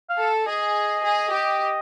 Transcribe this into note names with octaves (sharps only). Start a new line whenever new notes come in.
F5
A4
G#4 D#5
G#4
G4